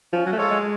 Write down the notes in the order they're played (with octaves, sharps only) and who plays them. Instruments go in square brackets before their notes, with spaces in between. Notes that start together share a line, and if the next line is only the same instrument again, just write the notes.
[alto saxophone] F3 [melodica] C#4
[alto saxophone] F#3
A3
[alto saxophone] G#3 [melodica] F4 A4 C#5
[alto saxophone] G#3